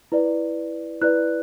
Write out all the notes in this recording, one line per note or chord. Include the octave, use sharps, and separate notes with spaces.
E4 B4 D5
E4 B4 D5 F#6